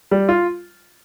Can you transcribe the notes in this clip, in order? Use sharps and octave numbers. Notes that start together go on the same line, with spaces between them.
G3
F4